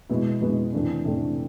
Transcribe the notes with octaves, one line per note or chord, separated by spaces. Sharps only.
B2 G#3 B3 E4
B2 G#3 B3 E4
C3 E3 A3 D4
C3 E3 A3 D4